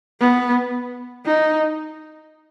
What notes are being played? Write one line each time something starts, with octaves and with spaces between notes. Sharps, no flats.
B3
D#4